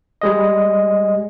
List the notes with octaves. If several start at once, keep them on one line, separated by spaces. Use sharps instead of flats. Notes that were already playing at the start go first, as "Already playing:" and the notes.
G3 G#3 D#5